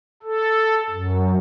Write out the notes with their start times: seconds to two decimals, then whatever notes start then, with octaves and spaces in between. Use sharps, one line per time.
0.23 A4
0.90 F#2